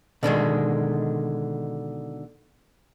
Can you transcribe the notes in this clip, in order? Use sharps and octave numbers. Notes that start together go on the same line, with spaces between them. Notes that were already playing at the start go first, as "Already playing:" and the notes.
B2 D3 D#3 G#3